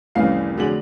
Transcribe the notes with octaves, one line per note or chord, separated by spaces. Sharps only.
F1 C2 E3 C#4 F5 C7
F1 D3 F#3 D4 G#4 F#7